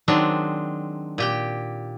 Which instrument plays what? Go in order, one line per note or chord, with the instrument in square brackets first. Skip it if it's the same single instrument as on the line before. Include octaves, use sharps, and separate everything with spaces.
[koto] D#3 F#3 G#3 C4 D4
A#2 G4 G5